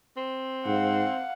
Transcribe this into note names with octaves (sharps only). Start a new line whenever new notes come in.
C4
G#2 F5 F#5